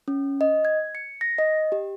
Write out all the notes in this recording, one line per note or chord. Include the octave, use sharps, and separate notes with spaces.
C#4
D#5
G#6
C#7
A#6
D#5
G4